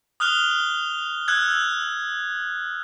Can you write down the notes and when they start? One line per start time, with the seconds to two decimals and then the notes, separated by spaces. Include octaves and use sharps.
0.20 D#6 F6 F#6 F7 G7
1.28 E6 F#6 G#6